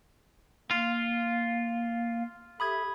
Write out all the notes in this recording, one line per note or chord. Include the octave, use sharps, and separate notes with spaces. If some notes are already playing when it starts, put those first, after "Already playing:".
A#3 F4 F5
G4 A4 E5 B5 D#6 G#6